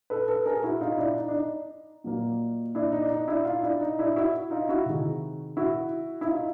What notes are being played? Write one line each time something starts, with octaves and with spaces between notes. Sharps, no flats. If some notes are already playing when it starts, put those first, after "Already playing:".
A4 B4
A4 B4
G#4 A#4
E4 F#4
D#4 F4
D4 E4
D#4
D4
D#4
A#2 F#3 A#3
D4 E4
D#4
D4
D#4
D4 E4
D#4 F4
D4 E4
D#4
D4 E4
E4 F#4
D#4 F4
E4 F#4
C3 D#3 G#3
E4 F#4
E4
D#4 F4